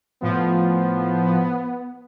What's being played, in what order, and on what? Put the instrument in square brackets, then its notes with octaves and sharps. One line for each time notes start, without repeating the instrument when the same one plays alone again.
[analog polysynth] A2 F3 [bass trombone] B3